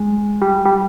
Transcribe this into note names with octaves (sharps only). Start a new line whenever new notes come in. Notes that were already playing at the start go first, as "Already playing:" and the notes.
Already playing: G#3
G3
G3